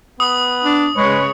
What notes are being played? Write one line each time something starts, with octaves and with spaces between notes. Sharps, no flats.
B3 D#6 F#7
D4
C#3 G#3 B4 C#5